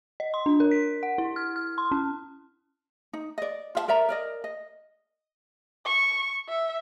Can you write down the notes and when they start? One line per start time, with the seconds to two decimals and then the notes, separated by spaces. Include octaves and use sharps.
0.20 D#5
0.34 C6
0.46 D4
0.60 A#4
0.71 B6
1.03 F#5
1.18 E4
1.36 F6
1.56 F6
1.78 C6
1.92 C#4
3.13 D#4
3.38 D5 D#5
3.75 F4 E5 A5
3.88 A#4 D5 E5 A#5
4.09 A#4 D5 D#5
4.44 D#5
5.86 C#6
6.49 E5